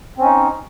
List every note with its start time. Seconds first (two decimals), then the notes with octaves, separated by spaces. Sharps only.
0.18 C4
0.21 C#4
0.25 D#4